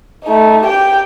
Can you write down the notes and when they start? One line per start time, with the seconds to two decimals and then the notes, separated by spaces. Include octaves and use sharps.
0.24 A3 D#4
0.64 G4 G5